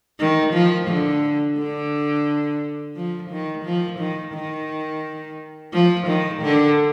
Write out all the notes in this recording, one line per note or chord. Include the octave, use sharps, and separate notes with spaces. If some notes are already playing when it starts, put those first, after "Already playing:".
D#3
F3
D3
D3
F3
D#3
F3
D#3
D#3
F3
D#3
D3